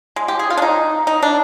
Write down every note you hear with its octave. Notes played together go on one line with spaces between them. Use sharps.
G#3
G4
G#4
F4
D4
D#4
D#4
D4